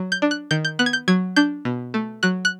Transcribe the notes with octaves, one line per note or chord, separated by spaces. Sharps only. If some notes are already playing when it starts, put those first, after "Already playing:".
Already playing: F#3
G6
D4
F#6
D#3 G6
G6
B3 F#6
G#6
G6
F#3 G#6
D4 G6
B2
A3
F#3 F#6
F#6